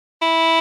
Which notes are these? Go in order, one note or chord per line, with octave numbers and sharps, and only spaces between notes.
E4